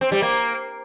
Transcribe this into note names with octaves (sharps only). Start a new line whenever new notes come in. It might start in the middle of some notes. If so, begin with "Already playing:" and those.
C4
G3
A#3